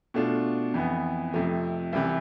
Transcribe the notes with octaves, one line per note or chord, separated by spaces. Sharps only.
B2 A3 D4 F4
F2 E3 B3
F2 C3 F3 A3
C2 C3 E3